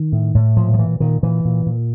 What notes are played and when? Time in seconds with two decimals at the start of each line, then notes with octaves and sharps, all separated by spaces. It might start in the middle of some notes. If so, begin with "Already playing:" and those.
Already playing: D#3
0.12 A2
0.35 A2
0.57 A#2 F3
0.74 F3
0.79 A#2 E3
1.00 A#2 D#3
1.23 A#2 E3
1.45 A#2
1.66 A#2